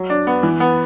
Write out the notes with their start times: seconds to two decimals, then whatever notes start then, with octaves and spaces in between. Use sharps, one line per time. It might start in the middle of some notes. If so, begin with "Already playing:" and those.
Already playing: F#3
0.10 D4
0.27 B3
0.43 E3
0.60 B3